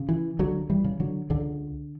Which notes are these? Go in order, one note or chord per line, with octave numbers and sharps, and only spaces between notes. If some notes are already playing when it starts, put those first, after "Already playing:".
Already playing: C#3
E3
C#2 D3 F#3
E3 G3
C#3
D3 F#3
C#2 D3